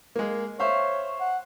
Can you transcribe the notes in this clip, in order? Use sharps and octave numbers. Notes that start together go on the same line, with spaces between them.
G#3 A#3
C5 C#5 E5 F5
F#5